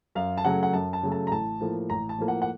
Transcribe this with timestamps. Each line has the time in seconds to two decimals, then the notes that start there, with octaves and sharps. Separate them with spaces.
0.15 F#2 F5
0.37 A5
0.45 C#3 F#3 A3 F#5
0.63 F#5
0.73 F#2 A5
0.93 A5
1.03 C#3 F#3 A3
1.12 A5
1.27 A#5
1.31 A1 A5
1.61 A2 F3 A#3
1.90 A1 A#5
2.09 A5
2.18 A2 F3 A#3
2.28 F#5
2.42 F#5